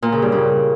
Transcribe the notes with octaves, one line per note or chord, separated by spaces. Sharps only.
A#2
C#3
G2
C#3